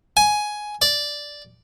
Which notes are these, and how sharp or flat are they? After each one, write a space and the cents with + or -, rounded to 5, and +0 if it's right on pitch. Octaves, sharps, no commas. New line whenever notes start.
G#5 +10
D5 -5